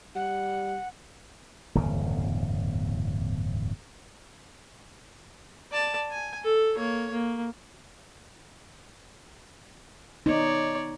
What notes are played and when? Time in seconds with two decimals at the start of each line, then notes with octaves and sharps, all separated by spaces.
0.15 G3 F#5
1.75 D1 G1 E2 C#3
5.71 D5 A5
6.11 G#5
6.44 A4
6.76 A#3 C#5
7.11 A#3
10.26 B3 D#4 C#5 D5